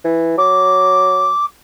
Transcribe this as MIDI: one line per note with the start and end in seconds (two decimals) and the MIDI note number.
0.04 0.34 52
0.37 1.30 54
0.37 1.45 86